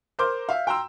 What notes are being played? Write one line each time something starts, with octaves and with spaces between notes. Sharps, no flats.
A#4 C5 C6 D6 F6 G6
E5 F5
G5 A#5 C6 E6